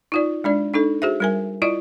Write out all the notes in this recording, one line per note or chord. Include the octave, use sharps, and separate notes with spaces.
D#4 F4 D5
G#3 D4 D5
D4 D#4 A4
F#4 G#4 C5 E5
G3 A#4 G#5
E4 F4 D5 D#5